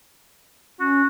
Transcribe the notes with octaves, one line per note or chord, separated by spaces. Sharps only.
C#4 F#4